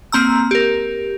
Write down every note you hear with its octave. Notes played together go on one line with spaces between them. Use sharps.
A#3 C4 A#5 E6
G4 A#4